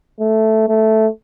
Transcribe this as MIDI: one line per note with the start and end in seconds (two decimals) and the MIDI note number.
0.20 0.68 57
0.68 1.07 57